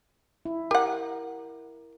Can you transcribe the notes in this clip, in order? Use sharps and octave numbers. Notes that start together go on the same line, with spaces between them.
E4
G4 A#4 F#5